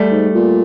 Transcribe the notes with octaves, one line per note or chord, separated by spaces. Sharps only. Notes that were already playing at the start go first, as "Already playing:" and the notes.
Already playing: G3 A3
G#2
A#2